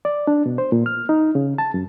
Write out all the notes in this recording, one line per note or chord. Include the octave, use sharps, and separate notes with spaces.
D5
D4
B2
C5
A#2
F6
D#4
C#3
A5
F#2